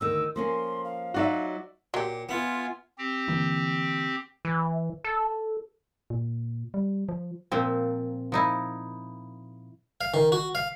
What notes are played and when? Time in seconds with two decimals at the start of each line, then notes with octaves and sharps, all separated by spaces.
0.01 D2 D#3 E6
0.36 F3 A#3 C#4 C6
0.84 F5
1.14 F#3 D#4 F4 F#4 D5 E5
1.94 A#2 F#3 G4
2.29 B3 F4 E5 G#5
2.98 C4 G4
3.28 D3 E3 A#3
4.45 E3
5.04 A4
6.10 A#2
6.74 G3
7.09 F3
7.52 A#2 F3 C4
8.32 F3 D#4 E4
10.01 F5
10.14 D#3
10.32 F#4
10.55 F5